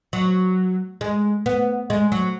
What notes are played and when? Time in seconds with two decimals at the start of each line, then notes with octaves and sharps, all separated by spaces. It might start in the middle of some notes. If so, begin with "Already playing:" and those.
0.13 F#3
1.01 G#3
1.46 B3
1.90 G#3
2.12 F#3